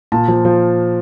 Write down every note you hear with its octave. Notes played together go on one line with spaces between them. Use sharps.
A#2 A5
F3
F3